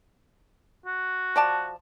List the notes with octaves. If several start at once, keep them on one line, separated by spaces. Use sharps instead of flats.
F#4
F3 D5 A5